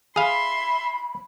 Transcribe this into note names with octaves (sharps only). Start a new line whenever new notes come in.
G#4 E5 F5 B5 C6